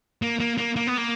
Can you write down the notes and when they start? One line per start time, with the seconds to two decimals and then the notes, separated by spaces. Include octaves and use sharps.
0.22 A#3
0.40 A#3
0.58 A#3
0.76 A#3
0.87 B3
0.97 A#3